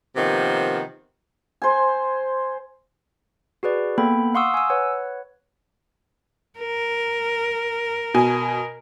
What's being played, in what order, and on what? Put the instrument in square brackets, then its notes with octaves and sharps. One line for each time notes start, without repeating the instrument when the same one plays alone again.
[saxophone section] C3 D#3 F3 A#3 B3
[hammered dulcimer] C5 G#5
[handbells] F#4 G#4 B4 D5
A#3 B3 A4 G5 B5
F5 F#5 C6 C#6 D#6 E6
G#5 E6
B4 C#5 F#5
[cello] A#4
[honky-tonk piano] B2 G#5